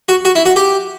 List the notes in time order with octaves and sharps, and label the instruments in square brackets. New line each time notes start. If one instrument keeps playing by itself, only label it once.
[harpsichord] F#4
F#4
E4
F#4
G4